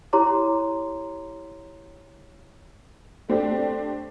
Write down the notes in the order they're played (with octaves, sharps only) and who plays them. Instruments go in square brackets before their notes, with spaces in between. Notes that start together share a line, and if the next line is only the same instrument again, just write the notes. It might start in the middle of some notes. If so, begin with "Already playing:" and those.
[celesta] E4 G4 C#5 A#5 C6 D6
[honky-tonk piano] A3 C4 D4 G4